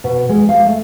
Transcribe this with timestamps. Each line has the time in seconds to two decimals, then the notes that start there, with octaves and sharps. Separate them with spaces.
0.04 B2
0.29 G#3
0.49 F5
0.65 A3